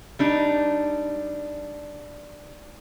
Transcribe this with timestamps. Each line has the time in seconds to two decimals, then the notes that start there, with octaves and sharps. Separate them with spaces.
0.19 G3 D4 D#4